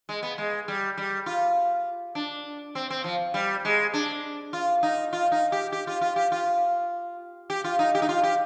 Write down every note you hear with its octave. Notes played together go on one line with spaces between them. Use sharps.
G#3
B3
G#3
G3
G3
F4
D4
C4
C4
F3
G3
G#3
D4
F4
D#4
F4
D#4
G4
G4
F4
F4
G4
F4
G4
F4
D#4
G4
D#4
F4
G4